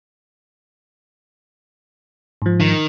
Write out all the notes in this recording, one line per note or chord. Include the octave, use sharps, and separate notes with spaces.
G#2 F3
D#3